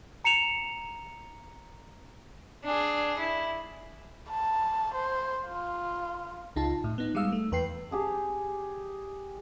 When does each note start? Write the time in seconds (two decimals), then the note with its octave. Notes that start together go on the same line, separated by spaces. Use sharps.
0.24 A#5 C#7 E7 F7
2.64 D4 G#4
3.19 E4
4.29 A5
4.94 C5
5.47 F4
6.56 C#2 D#4 F4 A5
6.84 A2
6.98 B3 D#4
7.15 G3 G#3 F5 E6
7.32 A3
7.52 E2 B4 G5 C7
7.91 G4 G#4 A5